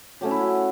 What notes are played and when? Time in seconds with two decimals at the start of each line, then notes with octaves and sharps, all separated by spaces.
0.21 F#3 A3 C#4 G4
0.31 E4
0.41 F#4